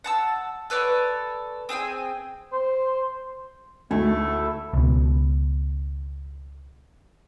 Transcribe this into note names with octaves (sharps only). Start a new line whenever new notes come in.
F#5 A5 E6
A4 B4 C#5 D5
C4 G#4 G5 G#5
C5
D2 A3 E4 A4
C#2 B2